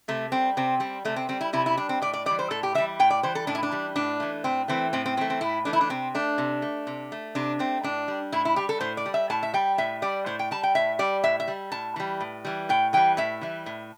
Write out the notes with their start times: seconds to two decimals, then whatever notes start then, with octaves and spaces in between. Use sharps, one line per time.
0.08 C3 A3
0.32 G3 C4
0.57 C3 C4
0.80 G3 C4
1.05 C3 A3
1.16 C4
1.29 G3 C4
1.41 E4
1.53 C3 E4
1.66 E4
1.77 G3 D4
1.89 C4
2.02 A2 D5
2.14 D5
2.26 G3 D5
2.31 E3
2.39 C5
2.50 A2 A4
2.63 G4
2.74 E3 G3 E5
2.99 A2 G5
3.10 D5
3.23 E3 G3 C5
3.35 A4
3.47 A2 D4
3.55 E4
3.63 D4
3.72 E3 G3
3.96 A2 D4
4.20 E3 A3
4.44 A2 C4
4.68 E3 A3 C4
4.93 A2 C4
5.06 C4
5.17 E3 C4
5.21 A3
5.30 C4
5.41 A2 E4
5.65 E3 A3 D4
5.73 E4
5.81 D4
5.89 C3 C4
6.15 A3 D4
6.38 C3
6.62 A3
6.87 C3
7.12 A3
7.35 C3 D4
7.59 A3 C4
7.83 A2 D4
8.08 G3
8.32 A2 E4
8.45 E4
8.56 G3 G4
8.69 A4
8.80 A2 C5
8.97 D5
9.06 G3
9.14 E5
9.30 A2 A5
9.43 E5
9.54 G3 G5
9.78 A2 E5
10.02 G3 D5
10.26 A2 C5
10.39 G5
10.51 G3 A5
10.63 G5
10.75 A2 E5
10.99 G3 D5
11.23 A2 E5
11.40 E5
11.48 G3
11.72 A2 A5
11.96 E3 G3
12.20 A2
12.45 E3 G3
12.69 A2 G5
12.93 E3 G3 G5
13.17 A2 E5
13.41 E3 G3
13.66 A2